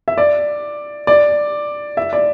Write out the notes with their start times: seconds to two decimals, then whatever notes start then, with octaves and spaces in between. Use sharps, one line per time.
0.08 E5
0.18 D5
1.07 D5
1.97 E5
2.13 D5